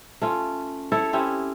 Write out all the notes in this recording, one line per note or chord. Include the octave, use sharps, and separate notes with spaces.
A3 C#4 F4
E4 A4 C#5
C4 C#4 E4 G4